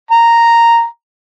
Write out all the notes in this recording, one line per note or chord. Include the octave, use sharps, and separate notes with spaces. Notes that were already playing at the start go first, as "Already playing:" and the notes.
A#5